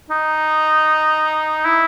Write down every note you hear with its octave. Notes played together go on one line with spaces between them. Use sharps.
D#4
E4